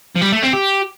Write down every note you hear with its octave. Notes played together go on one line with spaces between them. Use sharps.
F3
G3
A3
C4
G4